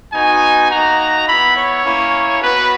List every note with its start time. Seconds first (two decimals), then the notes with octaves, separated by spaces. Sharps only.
0.13 B3 D#4 F#4 G#5
0.70 A#3 D#4 F#4 A#5
1.28 B3 E4 B5
1.56 C#5
1.85 A#3 C#4 E4
2.42 B3 F#4 B4